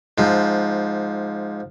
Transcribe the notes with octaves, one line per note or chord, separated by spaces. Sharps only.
G#2 F3